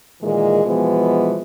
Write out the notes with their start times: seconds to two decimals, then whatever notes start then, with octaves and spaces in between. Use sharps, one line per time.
0.22 A#2 D#3 E3 G#3
0.65 B2 E3 F3 G#3 B3